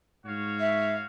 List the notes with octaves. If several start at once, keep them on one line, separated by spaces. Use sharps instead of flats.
G#2 F#4 C#5 F5
E5